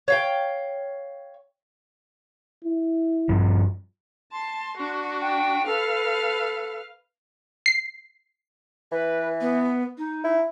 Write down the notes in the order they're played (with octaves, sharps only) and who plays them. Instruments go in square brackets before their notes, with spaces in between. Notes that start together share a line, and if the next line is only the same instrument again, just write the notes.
[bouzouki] C#5 F5 G5
[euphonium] E4
[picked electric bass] G2 F3
[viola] A5 [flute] C6
[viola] D4 F#4
[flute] G5
[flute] A4 [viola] B4 F5
[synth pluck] C7
[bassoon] E3 [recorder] B4
[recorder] B3
D#4
[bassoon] E4